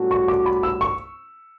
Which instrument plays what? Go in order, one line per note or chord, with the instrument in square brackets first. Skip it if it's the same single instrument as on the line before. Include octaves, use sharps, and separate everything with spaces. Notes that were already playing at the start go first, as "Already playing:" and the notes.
Already playing: [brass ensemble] A2 G3 C#4 F#4 A4
[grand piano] C#6
D6
B5
E6
C#6